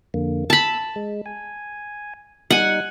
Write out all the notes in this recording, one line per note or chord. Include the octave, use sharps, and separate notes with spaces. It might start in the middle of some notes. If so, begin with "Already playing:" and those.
F2 D3 A#3
A5 B5 E6
G#3
G#5
G3 D#4 F#5 G#5